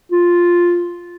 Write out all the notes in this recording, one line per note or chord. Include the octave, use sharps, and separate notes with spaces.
F4